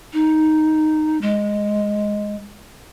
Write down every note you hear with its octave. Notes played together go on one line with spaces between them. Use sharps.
D#4
G#3